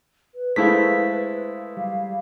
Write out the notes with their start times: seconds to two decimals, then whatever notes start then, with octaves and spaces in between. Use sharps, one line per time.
0.35 B4
0.56 G#3 A3 E4 B4 C5 F5 B6
1.77 G3 F5